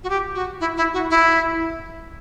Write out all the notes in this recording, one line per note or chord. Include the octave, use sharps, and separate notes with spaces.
F#4
G4
F#4
E4
E4
F#4
E4